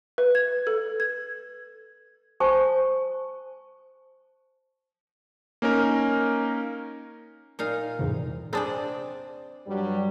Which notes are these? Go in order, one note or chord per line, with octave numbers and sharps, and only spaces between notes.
B4
G#6
A4
G#6
C5 G#5 A5 C#6
A#3 C#4 D#4 A#4
A#2 D#4 F5
E2 G#2 C3
C4 D4 G#4 D5 A5 D#6
G2 F#3 G3